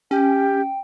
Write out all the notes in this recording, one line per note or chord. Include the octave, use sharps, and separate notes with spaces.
C#4 G4 G5